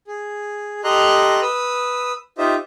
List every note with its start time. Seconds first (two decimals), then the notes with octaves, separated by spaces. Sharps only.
0.07 G#4
0.84 G4 A4 D#5 A#5 C6 F#6
1.42 B4 D#6 E6
2.38 D#4 F4 G4 C5 D#5 E5